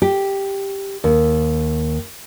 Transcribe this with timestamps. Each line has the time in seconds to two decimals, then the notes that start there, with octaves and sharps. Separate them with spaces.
0.02 G4
1.04 D#2